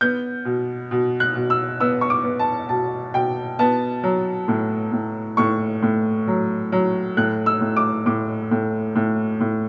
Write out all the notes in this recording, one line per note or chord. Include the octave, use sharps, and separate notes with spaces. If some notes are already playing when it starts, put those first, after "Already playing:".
B3 G6
B2
B2
F#6
B2
E6
B3 E6
C#6
D6
B3
A5
B2 A5
B2 G5
B3 A5
F#3
A2
A2
A2 C#6
A2
F#3
F#3
A2 F#6
E6
A2
D6
A2 D6
A2
A2
A2